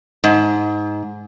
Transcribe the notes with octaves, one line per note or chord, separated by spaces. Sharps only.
G#2